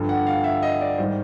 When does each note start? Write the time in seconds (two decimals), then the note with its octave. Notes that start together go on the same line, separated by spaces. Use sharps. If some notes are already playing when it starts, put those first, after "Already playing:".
Already playing: G2 D3 F3
0.09 F#5
0.27 F5
0.44 E5
0.62 D#5
0.81 D5
0.98 G#2 D#3 G3 C5